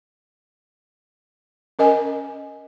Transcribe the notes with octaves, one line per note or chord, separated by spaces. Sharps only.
C#4 A#4 D#5 G#5